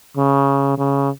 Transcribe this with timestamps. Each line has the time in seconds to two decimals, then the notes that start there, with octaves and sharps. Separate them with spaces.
0.17 C#3
0.78 C#3